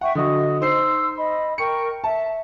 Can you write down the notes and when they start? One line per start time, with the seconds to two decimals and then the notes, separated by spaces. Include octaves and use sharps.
0.01 E5 F#5 G5 C#6
0.15 D3 F#3 D#5 C#6 D#6
0.61 D#4 C5 C6 E6 C7
1.17 D#5 B5
1.58 A#4 G5 C#6 C#7
2.04 E5 A5